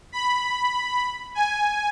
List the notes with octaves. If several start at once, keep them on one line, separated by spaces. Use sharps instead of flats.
B5
G#5